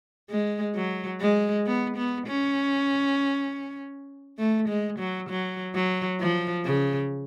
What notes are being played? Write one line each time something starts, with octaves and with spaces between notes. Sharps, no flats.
G#3
F#3
G#3
B3
B3
C#4
A3
G#3
F#3
F#3
F#3
F3
C#3